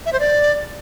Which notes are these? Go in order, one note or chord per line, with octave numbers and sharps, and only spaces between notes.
E5
C5
D5